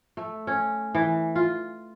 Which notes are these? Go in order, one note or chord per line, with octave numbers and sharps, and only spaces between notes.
A3
C#4
E3
F4